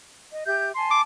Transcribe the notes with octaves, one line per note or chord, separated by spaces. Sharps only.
D#5
G4 E5 G6
G#5 A5 C6
D6